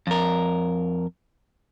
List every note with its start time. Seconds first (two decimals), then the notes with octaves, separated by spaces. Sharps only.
0.07 F2 A#4